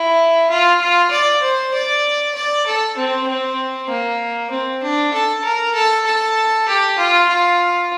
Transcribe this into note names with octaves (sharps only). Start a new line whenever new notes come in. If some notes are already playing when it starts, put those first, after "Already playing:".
Already playing: E4
F4
F4
D5
C5
D5
D5
A4
C4
C4
A#3
C4
D4
A4
A#4
A4
A4
G4
F4
F4